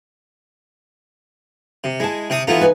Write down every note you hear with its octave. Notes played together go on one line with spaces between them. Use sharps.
C3
G#3 E4 A5
C3 C4 D#6
E3 B3 D#4 F4 A4
D#4 B4 G#5